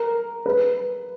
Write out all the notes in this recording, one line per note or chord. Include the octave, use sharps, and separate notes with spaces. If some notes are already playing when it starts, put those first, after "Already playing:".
Already playing: A#4
B4